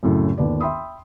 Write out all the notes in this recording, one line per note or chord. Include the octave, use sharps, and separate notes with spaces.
C2 F#2 A2 C#3
G1 D#2 B4 D5
E5 G5 B5 C6 D#6